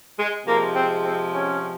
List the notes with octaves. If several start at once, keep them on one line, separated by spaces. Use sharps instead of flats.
G#3
C3 F3 G#3 A#3
C4
C4
C#4